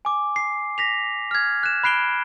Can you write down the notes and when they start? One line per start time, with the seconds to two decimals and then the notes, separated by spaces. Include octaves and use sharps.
0.05 G#5 D6
0.36 C7
0.78 A#6 B6 F7
1.31 F6 G#6
1.63 F#6 E7
1.84 B5 F#6 C7 D7 G7